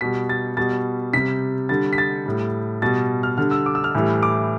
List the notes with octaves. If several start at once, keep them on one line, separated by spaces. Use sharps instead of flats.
B2 G3 B6
A6
B2 G3 A6
C3 G3 B6
D3 G3 A6
B6
A6
A2 G3
B2 G3 A6
F6
D3 G3 F6
E6
D6
E6
F6
A2 E3 G3
D6